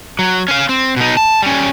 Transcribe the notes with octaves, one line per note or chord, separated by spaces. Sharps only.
F#3
C#4 F5
C4
B2 D#4
A5
G3 C#4